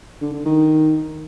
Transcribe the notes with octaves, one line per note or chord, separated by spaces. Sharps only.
D3
D3
D#3